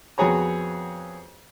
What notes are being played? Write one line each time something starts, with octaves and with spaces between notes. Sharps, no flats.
F2 B3 F#4 G#4 C#5 A#5